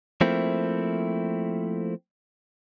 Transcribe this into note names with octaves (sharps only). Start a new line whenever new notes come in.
F3 A3 A#3 C4 E4